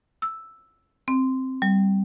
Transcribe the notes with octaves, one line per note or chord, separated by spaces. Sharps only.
E6
C4
G3